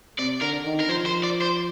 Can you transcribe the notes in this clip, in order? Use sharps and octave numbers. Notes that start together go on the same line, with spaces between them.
C3 D5
D3 A#4
D#3
A#4
F3 C5
C5
D5
C5